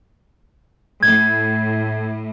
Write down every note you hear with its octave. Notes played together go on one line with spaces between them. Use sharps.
A2 G#6